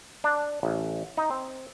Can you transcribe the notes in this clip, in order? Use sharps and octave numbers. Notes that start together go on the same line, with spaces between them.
D4
A1
D#4
C4